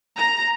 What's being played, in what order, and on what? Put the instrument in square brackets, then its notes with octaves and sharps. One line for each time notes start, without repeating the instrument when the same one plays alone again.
[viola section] A#5